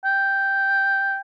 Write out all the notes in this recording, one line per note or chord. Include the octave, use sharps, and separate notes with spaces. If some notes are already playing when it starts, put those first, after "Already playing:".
G5